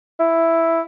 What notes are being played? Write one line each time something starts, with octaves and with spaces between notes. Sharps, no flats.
E4